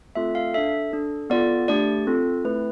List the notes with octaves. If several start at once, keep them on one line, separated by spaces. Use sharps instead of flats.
A3 C4 F4 A4 E5
F5
D4 A4 E5
D4 A4
B3 F4 A4 D5
A3 D4 G4 D5
C4 F4 A4
A3 C4 E4 B4